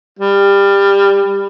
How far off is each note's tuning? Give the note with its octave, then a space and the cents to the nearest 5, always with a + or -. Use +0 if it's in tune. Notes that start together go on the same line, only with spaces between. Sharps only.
G3 +20